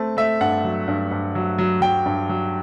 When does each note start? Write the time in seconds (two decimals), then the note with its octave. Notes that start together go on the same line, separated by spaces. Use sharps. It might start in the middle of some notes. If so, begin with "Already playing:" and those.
Already playing: A3 C4 A5
0.17 A3 E5
0.41 G2 F#5
0.64 F#3
0.88 G2
1.11 G2
1.35 F#3
1.58 F#3
1.81 F#3 G5
2.06 G2
2.29 F#3